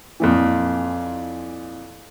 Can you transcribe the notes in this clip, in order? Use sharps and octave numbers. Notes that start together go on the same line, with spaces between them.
F2 A#2 E3